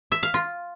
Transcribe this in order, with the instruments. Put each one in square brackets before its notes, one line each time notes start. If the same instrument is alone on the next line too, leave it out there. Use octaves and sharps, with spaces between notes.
[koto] E5
F5
F4